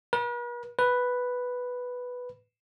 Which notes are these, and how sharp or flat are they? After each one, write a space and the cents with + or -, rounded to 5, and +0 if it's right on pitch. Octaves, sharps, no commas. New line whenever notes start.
B4 -45
B4 +0